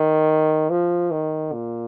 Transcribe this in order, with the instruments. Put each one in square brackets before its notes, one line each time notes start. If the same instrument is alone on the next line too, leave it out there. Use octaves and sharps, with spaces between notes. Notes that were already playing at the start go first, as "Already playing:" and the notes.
Already playing: [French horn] D#3
F3
D#3
A#2